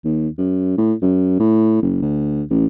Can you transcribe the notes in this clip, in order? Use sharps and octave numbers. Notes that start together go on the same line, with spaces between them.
D#2
F#2
A2
F#2
A2
F#1
D2
A1